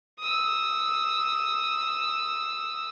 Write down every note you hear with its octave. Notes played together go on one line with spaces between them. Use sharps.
D#6 E6